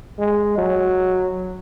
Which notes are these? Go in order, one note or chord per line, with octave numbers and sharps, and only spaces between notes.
G#3
F#3